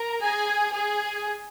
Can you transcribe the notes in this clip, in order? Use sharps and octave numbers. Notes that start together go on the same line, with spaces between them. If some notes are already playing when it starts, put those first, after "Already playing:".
Already playing: A#4 A#5
G#4 G#5
G#4 G#5